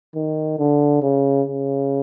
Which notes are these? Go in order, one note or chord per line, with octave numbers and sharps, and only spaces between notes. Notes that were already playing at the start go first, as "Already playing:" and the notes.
D#3
D3
C#3
C#3